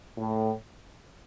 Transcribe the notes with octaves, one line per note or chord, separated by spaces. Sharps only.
A2